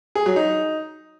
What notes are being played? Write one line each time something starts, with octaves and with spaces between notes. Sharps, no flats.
G#4
F#3
D#4